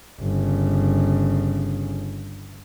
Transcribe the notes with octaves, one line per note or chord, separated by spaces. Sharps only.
G1 C#3